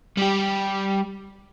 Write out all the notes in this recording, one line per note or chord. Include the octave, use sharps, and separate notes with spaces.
G3 G4